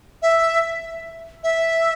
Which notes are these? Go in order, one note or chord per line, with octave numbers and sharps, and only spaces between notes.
E5
E5